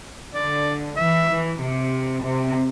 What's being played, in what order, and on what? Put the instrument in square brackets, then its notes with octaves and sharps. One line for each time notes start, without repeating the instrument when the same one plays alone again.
[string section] D3 [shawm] D5
[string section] E3 [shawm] E5
[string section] E3
C3
C3